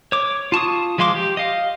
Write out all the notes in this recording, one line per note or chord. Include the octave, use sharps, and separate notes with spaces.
C#5 D6
F4 A5 C#6 D#6
F3 G#3 F5 C6 D6
G4
D#5 F5